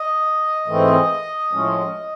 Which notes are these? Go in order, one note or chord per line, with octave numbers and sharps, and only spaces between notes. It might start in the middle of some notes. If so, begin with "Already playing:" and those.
Already playing: D#5
G#2 E3 A3 C4
A2 F3 G#3 C#4